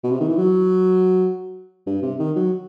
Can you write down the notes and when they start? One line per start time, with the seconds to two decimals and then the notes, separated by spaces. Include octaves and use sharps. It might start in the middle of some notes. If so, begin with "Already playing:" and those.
0.04 B2
0.11 C3
0.20 D#3
0.28 E3
0.37 F#3
1.87 G2
2.02 C3
2.19 D#3
2.36 F#3